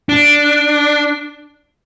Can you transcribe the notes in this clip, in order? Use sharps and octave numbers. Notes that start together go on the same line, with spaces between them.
D4